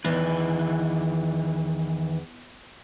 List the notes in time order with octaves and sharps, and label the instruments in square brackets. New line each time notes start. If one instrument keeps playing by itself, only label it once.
[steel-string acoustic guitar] E2 [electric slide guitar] D#3 E3 B4